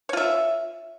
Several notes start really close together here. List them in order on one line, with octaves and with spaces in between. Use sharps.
C#5 F4 E5